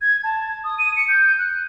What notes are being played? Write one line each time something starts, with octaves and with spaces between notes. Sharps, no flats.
G#6
A5
D#6
D#7
C#7
G6
F#6